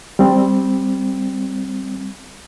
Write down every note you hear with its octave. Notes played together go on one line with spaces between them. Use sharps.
G3 C4